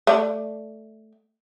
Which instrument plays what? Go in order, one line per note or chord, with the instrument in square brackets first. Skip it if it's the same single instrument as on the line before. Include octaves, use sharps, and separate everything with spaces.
[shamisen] A3 D5